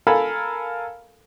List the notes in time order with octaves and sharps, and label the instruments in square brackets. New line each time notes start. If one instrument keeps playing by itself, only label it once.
[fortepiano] A4 A#4 F5 G#5 B5